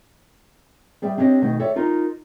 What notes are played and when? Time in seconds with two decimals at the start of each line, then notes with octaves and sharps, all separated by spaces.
1.02 G3 G#4 D5 E5 G5
1.18 C4 D4 G4 C#5 D#5
1.41 D2 B2 D#3 A3 D#5
1.59 A4 C#5 D5 E5 G5
1.76 D#4 F4 A#4